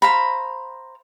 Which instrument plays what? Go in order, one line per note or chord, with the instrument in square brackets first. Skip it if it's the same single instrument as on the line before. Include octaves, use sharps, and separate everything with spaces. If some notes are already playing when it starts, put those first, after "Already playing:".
[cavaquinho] C5 F5 A#5 B5